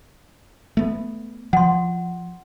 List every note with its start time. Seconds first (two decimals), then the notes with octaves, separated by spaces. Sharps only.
0.77 A3 B3
1.53 F3 F#5 C6